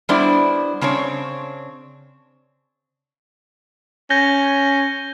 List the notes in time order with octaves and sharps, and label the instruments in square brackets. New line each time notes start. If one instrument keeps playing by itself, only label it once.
[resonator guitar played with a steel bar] G3 B3 D4 E4 C5 D5
C#3 C4 D4 C#5
[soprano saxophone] C#4 [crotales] G6 A#6 G7